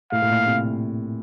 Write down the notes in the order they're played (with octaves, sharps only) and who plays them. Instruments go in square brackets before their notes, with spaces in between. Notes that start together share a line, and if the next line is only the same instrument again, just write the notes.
[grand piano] A2 [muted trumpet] F5
[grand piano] A2
A#2
C3